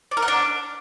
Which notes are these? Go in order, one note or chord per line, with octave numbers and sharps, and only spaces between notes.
D5
A#4
F#5
D4